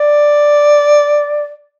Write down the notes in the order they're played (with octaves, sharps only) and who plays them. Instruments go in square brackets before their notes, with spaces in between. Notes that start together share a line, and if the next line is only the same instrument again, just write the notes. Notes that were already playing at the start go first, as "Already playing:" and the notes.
Already playing: [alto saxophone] D5